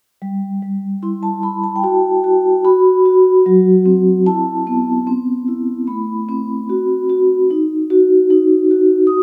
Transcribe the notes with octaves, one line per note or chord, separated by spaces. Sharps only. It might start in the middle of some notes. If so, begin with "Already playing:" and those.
G3
G3
E4 C6
A5
E4 B5
A5
G5
F#4 A5
F#4
F#4 B5
F#4
F#3
C4
E4 A5
B3
C4
E4
A3 B5
C4
F#4
F#4
D#4
F#4
D#4
F#4
D#6